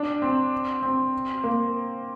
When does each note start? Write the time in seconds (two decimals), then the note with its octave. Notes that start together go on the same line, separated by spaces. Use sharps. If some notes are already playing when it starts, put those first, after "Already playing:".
Already playing: D4
0.22 C4
0.83 C4
1.44 A#3